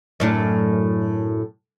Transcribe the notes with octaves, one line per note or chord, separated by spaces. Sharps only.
F#2 A2 D4